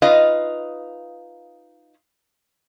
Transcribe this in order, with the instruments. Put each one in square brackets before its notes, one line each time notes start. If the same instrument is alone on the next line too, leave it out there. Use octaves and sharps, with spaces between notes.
[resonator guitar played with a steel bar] D#4 F4 B4 D#5 F5